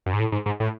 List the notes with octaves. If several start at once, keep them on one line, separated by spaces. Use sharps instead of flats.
F#2
G#2
A2
G#2
G#2
A2